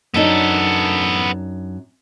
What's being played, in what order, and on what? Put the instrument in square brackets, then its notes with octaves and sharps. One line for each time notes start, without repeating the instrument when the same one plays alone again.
[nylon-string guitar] F#2 D4 D#4 [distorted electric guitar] B3 A4